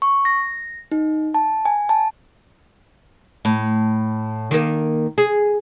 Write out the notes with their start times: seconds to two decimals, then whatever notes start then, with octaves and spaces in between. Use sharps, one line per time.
0.02 C#6
0.25 A#6
0.92 D#4
1.34 A5
1.65 G#5
1.89 A5
3.45 A2
4.51 D#3 A#3
5.18 G#4